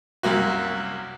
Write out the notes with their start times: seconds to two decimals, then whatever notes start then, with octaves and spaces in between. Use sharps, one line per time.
0.23 C2 F#2 A#3 F#4